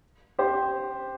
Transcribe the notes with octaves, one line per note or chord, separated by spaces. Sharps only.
G4 C5